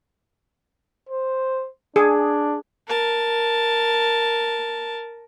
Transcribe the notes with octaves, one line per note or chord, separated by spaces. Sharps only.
C5
D4 G#4
A#4 A5